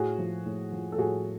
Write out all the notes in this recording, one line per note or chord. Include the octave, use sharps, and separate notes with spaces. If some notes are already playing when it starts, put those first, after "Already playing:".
Already playing: A2 F#4 G#4
F3
A2
F3
A4
A2 F#4 G#4